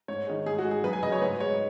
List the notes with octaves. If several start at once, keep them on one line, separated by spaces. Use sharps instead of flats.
G#2 C#5
D#3 G#3
G#2 G#4
F#4
G#3
G#4
F#2 B4
G#5
C#3 F#3 D#5
C#5
G#2 B4
G#3 C#5